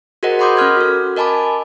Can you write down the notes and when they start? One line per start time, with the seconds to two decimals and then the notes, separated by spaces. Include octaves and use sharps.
0.23 F#4 G#4 A#4 C5 D#5 F#5
0.39 F#5 B5 C6 D6 D#6 G6
0.57 C#4 A#4 F6 G#6
0.77 F#4 A4
1.16 A#4 D#5 G#5 A5 B5 D6